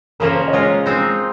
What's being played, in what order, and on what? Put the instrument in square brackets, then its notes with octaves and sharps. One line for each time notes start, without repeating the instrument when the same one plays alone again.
[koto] C#3 F3 A#3 C#4 [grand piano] A#4
[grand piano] C5
C#5
D#5
[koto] G#3 C#4 F4 A#4 [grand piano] C#5
[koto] G#3 C4 D#4